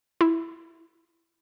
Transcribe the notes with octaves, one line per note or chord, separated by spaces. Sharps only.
E4